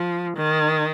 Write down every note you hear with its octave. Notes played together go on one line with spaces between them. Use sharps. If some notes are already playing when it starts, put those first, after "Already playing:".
Already playing: F3
D#3